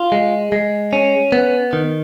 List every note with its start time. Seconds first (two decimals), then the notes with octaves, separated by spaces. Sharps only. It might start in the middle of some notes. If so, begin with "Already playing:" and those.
Already playing: F4
0.12 G#3
0.52 G#3
0.93 C#4
1.32 B3
1.73 D#3